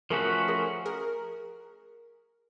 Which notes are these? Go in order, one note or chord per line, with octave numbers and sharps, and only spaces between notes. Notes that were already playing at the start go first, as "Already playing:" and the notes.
F3 A3 C#4 F#4 G#4 A#4 B4
G#4 A#4
G#4 A#4